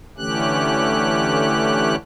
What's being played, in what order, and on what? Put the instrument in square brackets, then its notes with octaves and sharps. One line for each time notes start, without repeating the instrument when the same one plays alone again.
[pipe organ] D3 E3 A3 C#4 G4 F#6